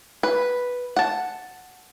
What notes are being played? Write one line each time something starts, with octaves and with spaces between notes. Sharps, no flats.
B4
F#5 A5